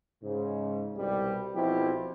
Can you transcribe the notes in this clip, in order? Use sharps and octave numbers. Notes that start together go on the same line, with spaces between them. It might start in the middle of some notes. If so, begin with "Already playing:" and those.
G#2 C#3
C2 B2 G3
B1 B2 F3 C4 E4 G4